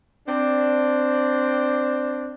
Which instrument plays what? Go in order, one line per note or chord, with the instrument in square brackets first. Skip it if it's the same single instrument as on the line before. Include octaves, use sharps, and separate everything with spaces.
[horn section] C4 D4